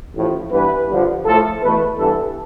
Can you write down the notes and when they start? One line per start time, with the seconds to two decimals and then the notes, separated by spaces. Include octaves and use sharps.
0.14 A1 A2 F3
0.51 G2 E3 B3 B4
0.88 G2 D3 F3
1.25 A2 F3 A3 A4
1.62 E2 B2 A3 B4
1.98 G2 E3 B3 A4